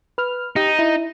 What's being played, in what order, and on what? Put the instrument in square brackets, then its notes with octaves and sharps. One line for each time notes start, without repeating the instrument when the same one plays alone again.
[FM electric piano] B4 F6
[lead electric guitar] D#4 [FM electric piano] G4
[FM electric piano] E4